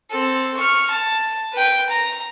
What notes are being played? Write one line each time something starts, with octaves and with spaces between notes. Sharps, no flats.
C4 A4
C#6 F6
A5
B4 G5
A#5